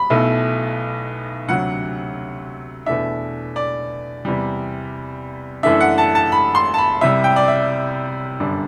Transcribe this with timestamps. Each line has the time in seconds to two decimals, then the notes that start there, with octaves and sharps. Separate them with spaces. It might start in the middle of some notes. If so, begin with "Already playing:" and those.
Already playing: B5
0.10 B1 B2 A3 E4
1.48 D2 C3 F#3 F#5
2.86 E2 B2 A3 D4 E5
3.56 D5
4.25 E2 C3 G3
5.63 F#2 E3 A3 D4 E5
5.80 F#5
5.98 A5
6.15 A5
6.32 B5
6.55 C6
6.74 A5
6.78 B5
7.01 C2 C3 G3 E5
7.24 G5
7.36 D5
7.48 E5
8.40 G1 F#2 D3 G3 D4